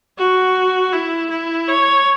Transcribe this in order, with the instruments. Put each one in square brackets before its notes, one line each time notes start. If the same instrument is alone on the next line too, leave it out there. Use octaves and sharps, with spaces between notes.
[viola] F#4
E4
E4
C#5